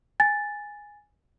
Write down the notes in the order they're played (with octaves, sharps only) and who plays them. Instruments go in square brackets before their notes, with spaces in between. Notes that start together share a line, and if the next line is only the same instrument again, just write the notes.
[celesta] G#5 A6